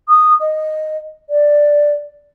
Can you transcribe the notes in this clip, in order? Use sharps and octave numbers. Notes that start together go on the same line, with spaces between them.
D#6
D#5
D5